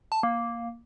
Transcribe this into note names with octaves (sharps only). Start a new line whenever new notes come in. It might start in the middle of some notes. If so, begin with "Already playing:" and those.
A5
A#3